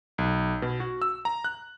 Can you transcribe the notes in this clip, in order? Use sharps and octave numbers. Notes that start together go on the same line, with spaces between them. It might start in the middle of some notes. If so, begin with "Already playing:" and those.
B1
B2
F#4
E6
A#5
F#6